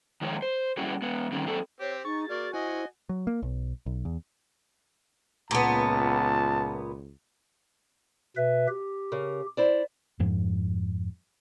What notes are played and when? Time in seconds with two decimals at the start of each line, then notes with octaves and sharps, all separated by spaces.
0.21 D#3 F3 G#3 C#5
0.42 C5
0.77 F#3 G3 C#4 E4 F#4 G#4
1.02 G#3 B3
1.32 D#3 F#3 G3 C4 C#4 D#4
1.46 F#3 C4 G#4 A4
1.80 C4 G4 C#5
2.05 D#4 G#4 C#6 A6
2.29 A#3 F#4 D5
2.54 E4 C5 D#5 F#5 G#5
3.09 F#3
3.27 A#3
3.42 B1
3.86 B1
4.05 E2
5.51 C#2 A#2 B3 A5
8.37 B2 B4 E5
8.68 G4
9.12 C#3 A#4
9.57 E4 C5 D5
10.20 F2 G#2 F3